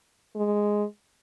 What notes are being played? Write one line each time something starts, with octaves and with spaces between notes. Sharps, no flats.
G#3